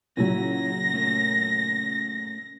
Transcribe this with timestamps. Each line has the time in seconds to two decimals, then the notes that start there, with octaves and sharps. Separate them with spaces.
0.17 A#2 C#3 F#3 C#4 E4 A#6
0.94 A3 C#4 A#4